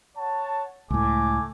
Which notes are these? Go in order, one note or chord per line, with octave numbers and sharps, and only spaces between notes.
C#5 F#5 A5
C#2 A2 A3 G#5 D6